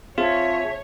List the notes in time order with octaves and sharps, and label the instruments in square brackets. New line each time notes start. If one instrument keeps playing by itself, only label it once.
[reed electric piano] C4 G#4 [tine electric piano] F4 [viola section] C#5 [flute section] E5 G#5 A5